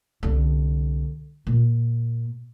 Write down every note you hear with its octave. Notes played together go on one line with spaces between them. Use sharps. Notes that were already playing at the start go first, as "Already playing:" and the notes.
C2 D3
A#2